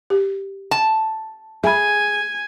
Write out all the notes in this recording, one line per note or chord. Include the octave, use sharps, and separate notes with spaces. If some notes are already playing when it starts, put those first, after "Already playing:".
G4
A5
G#4 E5 G#5 B5